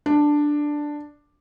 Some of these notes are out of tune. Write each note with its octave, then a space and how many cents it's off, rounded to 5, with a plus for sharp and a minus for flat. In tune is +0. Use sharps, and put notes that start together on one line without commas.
D4 +5